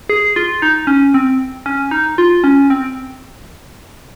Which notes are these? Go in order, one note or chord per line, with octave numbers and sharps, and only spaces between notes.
G#4
F4
D#4
C#4
C4
C#4
D#4
F4
C#4
C4